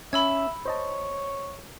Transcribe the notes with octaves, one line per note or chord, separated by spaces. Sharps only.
C#4 E5 B5 E6 G#6
C5 C#5 D#5 A5